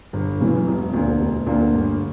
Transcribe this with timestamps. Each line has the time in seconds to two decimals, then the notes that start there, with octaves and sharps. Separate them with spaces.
0.13 G1
0.41 F#2 C#3 E3
0.67 E1
0.94 D2 D3 A#3
1.20 E1
1.47 D2 D3 A#3
1.74 G1